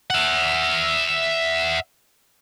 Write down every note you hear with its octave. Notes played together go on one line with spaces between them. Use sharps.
E5 F#5